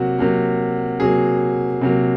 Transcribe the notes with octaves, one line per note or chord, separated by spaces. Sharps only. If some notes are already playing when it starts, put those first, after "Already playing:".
Already playing: C3 F#3 A#3 F#4
C3 F#3 A#3
C3 F#3 A#3 G#4
C3 F#3 A#3